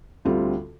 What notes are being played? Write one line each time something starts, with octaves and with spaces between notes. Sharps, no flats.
D2 D3 G3 C4 F4